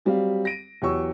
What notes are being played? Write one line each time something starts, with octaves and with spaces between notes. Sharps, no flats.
F#3 G3 C4 G4 F5
A#6 D7 D#7
E2 F#3 G4 C#5 C#6 E6